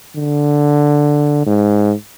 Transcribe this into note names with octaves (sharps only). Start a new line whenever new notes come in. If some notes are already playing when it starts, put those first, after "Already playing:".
D3
G#2